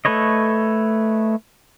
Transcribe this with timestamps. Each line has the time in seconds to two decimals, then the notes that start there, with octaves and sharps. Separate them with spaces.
0.05 A3 A4 B4 C#5 D#5